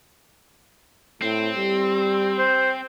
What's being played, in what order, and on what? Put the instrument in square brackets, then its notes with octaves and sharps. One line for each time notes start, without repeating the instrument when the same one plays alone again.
[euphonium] A2 [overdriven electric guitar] C4
[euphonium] G3
[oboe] C5